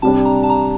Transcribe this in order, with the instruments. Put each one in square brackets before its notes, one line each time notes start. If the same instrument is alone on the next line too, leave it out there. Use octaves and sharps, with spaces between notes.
[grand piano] C3 G3 D4 [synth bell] A5
[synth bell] A#5
A5
A#5